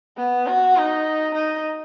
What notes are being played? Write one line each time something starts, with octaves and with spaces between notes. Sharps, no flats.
B3
F#4
D#4
D#4